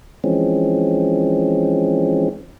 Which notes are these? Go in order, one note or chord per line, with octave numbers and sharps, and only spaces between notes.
E3 F3 G#3 C4 C#4